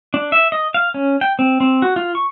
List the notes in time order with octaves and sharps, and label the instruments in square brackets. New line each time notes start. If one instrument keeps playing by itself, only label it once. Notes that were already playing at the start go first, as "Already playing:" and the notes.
[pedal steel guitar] D4
E5
D#5
F5
C#4
G5
C4
C4
F#4
F4
C#6